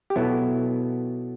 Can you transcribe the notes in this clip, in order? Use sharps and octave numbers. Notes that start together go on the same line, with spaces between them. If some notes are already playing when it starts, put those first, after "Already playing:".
G4
B2 F#3 B3 E4 A4